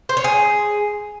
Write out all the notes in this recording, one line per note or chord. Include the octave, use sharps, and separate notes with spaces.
C5
C#5
G#4